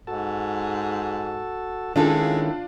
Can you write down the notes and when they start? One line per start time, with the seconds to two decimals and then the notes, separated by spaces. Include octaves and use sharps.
0.07 G#2 F#4 A4 A5
1.96 D#3 G#3 C#4 D4 E4 F4 A4 A5